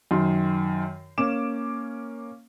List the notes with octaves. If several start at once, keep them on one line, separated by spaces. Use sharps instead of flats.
F#2 D#3 C6
A#3 C#4 D6 E7